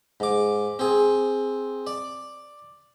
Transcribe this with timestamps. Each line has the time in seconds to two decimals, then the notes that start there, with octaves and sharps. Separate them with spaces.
0.20 G#2 D6
0.79 C4 G#4
1.87 D5